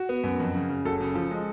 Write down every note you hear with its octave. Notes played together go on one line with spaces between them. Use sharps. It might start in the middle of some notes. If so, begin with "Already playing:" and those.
Already playing: F#4
B3
F#2
F2
C#3
C#3
F#1 F#4 A4
C#3
F3
G#3